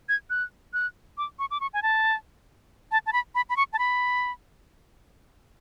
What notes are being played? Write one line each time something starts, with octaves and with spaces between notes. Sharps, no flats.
G#6
F#6
F#6
D6
C#6
D6
C#6
G#5
A5
A5
A5
B5
B5
B5
C#6
A5
B5